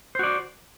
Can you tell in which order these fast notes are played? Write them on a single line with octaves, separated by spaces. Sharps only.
C5 F#4 D5